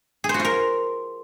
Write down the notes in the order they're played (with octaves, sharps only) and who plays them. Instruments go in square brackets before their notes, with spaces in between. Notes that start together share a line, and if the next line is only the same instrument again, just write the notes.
[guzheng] G#4
C5
F#4
F4
A#4